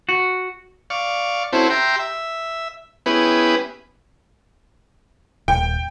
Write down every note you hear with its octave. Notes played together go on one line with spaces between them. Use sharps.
F#4
D5 F5 C#6
C4 C#4 E4 F#4 A4 C5
G4 E5 G5 A#5 C6
E5
B3 C#4 E4 G4 G#4 B4
D#1 G5